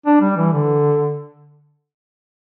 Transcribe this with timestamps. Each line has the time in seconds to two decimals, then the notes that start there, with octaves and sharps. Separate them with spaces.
0.06 D4
0.21 G3
0.37 E3
0.52 D3